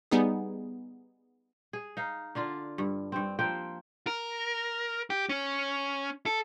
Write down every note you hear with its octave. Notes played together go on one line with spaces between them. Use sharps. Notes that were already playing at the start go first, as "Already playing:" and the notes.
G3 B3 D#4 G#4
G#4
D#4 F5
D3 D4 F4
G2
G2 C4
F3 A#3 C4 G5
A#4
G4
C#4
A4